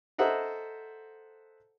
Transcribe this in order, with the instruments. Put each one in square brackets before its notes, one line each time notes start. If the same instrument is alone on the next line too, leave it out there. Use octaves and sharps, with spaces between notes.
[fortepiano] A4 C5 D#5 E5 F#5 A#5